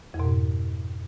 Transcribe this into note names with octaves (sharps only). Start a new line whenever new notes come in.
F2
B2
G#2